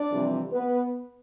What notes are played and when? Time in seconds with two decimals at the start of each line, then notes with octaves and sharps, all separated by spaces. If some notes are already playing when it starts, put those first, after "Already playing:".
Already playing: D4 D5
0.10 F2 C3 E3 G3
0.52 B3 B4